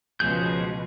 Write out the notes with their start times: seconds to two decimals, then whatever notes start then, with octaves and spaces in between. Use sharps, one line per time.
0.20 C#2 B2 F3 G#4 G6